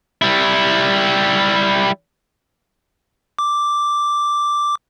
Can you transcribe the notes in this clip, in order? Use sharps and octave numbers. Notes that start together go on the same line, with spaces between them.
G3 E4
D6